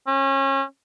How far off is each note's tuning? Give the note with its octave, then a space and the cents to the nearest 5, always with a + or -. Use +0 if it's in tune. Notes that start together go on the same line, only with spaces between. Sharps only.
C#4 -30